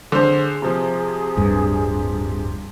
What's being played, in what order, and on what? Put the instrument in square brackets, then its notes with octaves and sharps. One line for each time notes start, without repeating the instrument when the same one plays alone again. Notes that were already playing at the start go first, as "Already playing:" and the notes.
[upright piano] D3 C5 [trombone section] G#4
[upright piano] C3 F3
[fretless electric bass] D1 G2